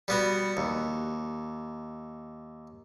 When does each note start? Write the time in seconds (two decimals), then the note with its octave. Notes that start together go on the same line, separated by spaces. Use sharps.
0.08 G3 B3 F#4
0.57 D#2